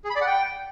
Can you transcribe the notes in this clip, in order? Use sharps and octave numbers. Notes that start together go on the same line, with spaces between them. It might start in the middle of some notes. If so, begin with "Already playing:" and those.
G#4
B5
D5
F#5
G5